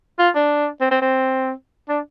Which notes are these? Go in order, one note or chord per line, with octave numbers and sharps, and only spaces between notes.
F4
D4
C4
C4
C4
D4